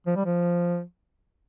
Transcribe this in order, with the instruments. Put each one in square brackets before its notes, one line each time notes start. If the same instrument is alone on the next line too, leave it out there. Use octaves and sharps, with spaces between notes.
[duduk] F3
G3
F3